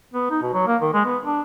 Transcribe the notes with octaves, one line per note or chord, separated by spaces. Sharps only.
B3
D#4
B2
F#3
A#3
D#3
G#3
B3
D4